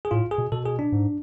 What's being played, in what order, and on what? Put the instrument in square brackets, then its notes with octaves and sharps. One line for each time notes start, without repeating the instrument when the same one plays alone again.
[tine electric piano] G#4
[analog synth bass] A2 [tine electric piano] F4
[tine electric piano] G#4
[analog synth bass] B2
[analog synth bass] B2 [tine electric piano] A4
[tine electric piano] G#4
D4
[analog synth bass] G#2